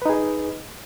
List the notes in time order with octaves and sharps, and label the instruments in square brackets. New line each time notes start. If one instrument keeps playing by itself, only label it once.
[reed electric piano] B4
D#4
G#4
D#5